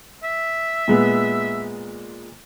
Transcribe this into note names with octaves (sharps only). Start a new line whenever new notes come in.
E5
A#2 G#3 B3